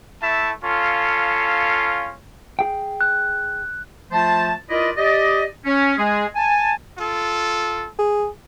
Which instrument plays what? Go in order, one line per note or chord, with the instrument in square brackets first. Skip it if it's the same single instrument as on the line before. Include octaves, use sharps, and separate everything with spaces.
[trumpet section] A3 E4 E5 A5
C#4 F4 A4 F5
[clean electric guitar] G#4 G5
[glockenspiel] F#6
[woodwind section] F3 A3 F4 C5 A5
E4 F4 A#4 B4 D5 D#5
G4 D5 D#5
C#4
G#3 G#4
G#5 A5
[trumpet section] F4 A4
[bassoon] G#4